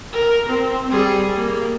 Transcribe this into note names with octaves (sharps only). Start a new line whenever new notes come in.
A#4
C4
G3 G#4
A#3